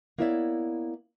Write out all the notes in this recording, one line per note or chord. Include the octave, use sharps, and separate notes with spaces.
A#3 B3 E4 C#5 D5 E5